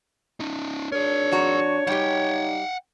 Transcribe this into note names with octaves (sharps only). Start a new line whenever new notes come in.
C#4 D#4
D4 G#4 A#4 C#5
F2 F#4 A#5
G3 D#4 G4 F#5 G5